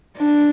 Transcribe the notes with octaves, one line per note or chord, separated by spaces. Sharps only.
D4